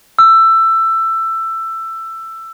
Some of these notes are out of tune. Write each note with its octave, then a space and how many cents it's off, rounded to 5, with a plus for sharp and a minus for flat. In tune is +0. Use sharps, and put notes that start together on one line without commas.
E6 +15